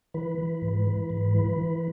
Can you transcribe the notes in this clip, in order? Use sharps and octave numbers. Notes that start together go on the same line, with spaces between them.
E3 B4
E3
G#2
E3
G#2
E3
E3